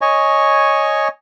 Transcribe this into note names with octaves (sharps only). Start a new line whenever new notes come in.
C#5 D#5 G#5 C#6